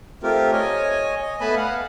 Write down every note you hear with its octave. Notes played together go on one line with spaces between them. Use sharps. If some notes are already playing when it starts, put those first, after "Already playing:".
A3 C4 F4 G4 A#4
C#5 D#5 G#5
D#5
A3 B3 B4 G#5 A5 B5
F5 F#5